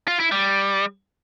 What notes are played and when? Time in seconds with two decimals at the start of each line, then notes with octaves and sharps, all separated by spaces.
0.08 F4
0.20 E4
0.32 G3